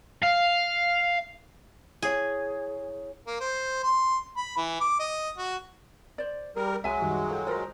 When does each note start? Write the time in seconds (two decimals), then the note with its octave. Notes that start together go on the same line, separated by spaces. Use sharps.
0.24 F5
2.02 E4 G#4 C#5
3.27 A#3
3.41 C5
3.84 C6
4.37 B5
4.57 E3
4.81 D6
5.00 D#5
5.38 F#4
6.18 C5 D5
6.56 G3 G#4 A#4
6.84 C2 F#3 G#3 E5 G#5
7.01 F#2 D#3 G3
7.29 F4 A4 G5
7.47 F4 A#4 C5 A#5